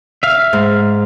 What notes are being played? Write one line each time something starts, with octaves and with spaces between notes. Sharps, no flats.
E5 F5
G#2